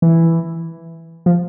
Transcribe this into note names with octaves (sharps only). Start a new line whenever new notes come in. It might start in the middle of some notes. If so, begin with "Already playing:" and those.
E3
F3